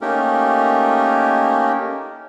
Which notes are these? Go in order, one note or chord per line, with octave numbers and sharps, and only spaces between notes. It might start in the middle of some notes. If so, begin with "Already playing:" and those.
A3 A#3 C#4 D#4 G4 A#4